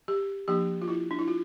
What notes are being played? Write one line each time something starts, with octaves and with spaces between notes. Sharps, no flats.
G4
F3 A#3 D4 G4
F4
E4
D4
E4
F4